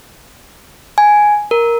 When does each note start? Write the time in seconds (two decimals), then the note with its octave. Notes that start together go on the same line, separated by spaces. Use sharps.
0.98 G#5
1.51 A#4